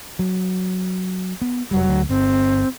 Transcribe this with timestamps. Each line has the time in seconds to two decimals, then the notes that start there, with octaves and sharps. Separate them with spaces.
0.19 F#3
1.42 B3
1.71 F1 F#3 G3
1.88 D2
2.09 G1 C4